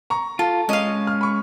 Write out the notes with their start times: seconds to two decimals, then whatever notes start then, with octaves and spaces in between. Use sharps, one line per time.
0.10 A#5 C#6
0.39 F4 A4
0.69 G#3 C#4 D#5 F5
1.07 F6
1.21 B5 C#6